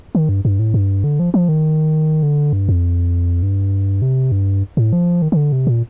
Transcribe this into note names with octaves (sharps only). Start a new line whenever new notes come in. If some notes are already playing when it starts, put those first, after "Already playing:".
D#3
G2
G2
A2
G2
D3
F3
F3
D#3
D3
G2
F2
G2
C3
G2
A2
F3
D#3
D#3
D3
C3
A#2